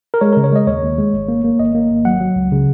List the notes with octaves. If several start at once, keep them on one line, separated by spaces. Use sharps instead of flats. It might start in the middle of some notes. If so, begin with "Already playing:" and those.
A#4
G#3 C#5
C#3 A#4
C#5
G#3 D#5
D#2 C#5
D#2
G#3
G#1
A#3
A#3
G#1 D#5
A#3
G#1
F#3 F#5
F#3
C#2
C#3